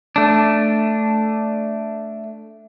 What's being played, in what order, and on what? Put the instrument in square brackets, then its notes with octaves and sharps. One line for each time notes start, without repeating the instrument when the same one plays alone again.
[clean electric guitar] A3 D4